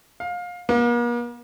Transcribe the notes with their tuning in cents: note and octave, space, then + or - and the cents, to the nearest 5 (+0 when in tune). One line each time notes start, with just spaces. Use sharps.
F5 +25
A#3 +45